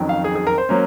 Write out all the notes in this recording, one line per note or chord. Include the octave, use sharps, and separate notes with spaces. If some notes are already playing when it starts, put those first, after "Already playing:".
Already playing: F2 D#3 F#3 C#4
F5
G#4
G#4
A#4
C5
F#3 A#3 C#4